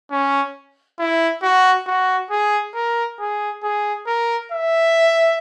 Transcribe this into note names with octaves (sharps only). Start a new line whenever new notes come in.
C#4
E4
F#4
F#4
G#4
A#4
G#4
G#4
A#4
E5